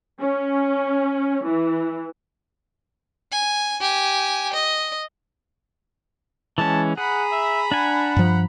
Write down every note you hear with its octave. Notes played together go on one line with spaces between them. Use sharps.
C#4
E3
G#5
G4 G#5
D#5
E3 G#3 C#4 A5
G#4 F#5 A#5 B5
E5
D4 F#5 G#5
G2 F3